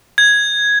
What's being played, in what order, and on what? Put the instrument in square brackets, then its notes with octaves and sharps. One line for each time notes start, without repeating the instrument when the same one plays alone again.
[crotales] G#6